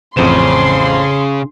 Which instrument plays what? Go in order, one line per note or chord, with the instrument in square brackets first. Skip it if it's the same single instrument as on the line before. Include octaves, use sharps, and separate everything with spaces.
[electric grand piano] A1 F2 E7 [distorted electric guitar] C#3 [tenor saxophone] C5 [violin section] C6